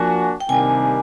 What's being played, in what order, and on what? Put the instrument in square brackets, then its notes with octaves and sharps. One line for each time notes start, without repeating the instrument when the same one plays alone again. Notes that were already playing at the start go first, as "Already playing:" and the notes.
Already playing: [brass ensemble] F3 A#3 D4 F#4 [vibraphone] G#5
[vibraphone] G5
[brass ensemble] C3 D#3 G3 A#3 D4 [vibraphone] G#5